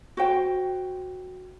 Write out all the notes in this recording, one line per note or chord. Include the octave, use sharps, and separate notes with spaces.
F#4 C5 G5